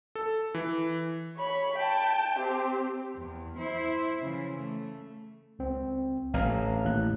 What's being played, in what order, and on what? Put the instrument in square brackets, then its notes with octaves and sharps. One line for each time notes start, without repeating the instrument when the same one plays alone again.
[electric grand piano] A4
E3
[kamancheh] C#5 B5
G5 A5
C4 G4
[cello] E2
E4 C5
C#3 E3
A3
[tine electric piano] C#2 C4
[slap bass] A1 [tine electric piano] F5 A#5 F6
[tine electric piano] D#2 A2 F#6